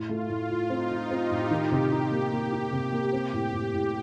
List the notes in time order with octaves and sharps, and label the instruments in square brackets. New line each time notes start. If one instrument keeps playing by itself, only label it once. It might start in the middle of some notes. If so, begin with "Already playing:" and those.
Already playing: [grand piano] A2 [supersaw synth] F4
[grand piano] A3
A2
F4
[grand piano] C4 [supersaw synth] D#4
[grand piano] F4
[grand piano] C4 [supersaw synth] G4
[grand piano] A2
D#3
C3
D#4
A#3
[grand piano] A#3 [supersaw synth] G4
[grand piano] D#4
C3
A#3
C4
A2
A2
A2